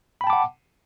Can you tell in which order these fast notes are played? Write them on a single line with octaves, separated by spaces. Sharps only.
B5 G5 A5 D6 F#5